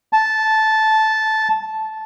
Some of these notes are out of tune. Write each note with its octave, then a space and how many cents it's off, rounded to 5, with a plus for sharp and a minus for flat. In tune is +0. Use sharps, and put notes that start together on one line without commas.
A5 -10